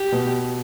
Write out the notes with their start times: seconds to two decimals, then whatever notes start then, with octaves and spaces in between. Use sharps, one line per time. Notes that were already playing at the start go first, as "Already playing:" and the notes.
Already playing: G4
0.12 B2